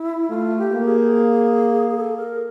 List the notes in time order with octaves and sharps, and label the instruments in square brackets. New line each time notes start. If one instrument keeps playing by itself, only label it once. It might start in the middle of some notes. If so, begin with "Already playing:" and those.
Already playing: [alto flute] E4
[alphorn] A3 [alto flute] F4
[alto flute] G4
[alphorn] A#3
[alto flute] G#4
A4
A#4